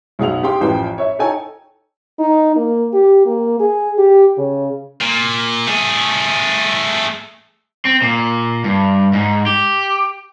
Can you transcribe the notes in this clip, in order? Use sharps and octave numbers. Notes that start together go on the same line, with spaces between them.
B1 G#4 F#5 F7
G4 G#4 F5 G5 C6
A1 F3 B4 G5
C#5 E5
D#4 A4 C#5 G5 G#5
D#4
A#3
G4
A#3
G#4
G4
C#3
A#2
A3 G#4
C4
A#2
G2
G#2
G4